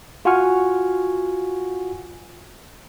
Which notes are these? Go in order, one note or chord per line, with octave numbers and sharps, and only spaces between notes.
F4 F#4 F#5 G#5 C#6 F6